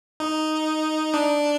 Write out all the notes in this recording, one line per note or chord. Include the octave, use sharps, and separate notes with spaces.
D#4
D4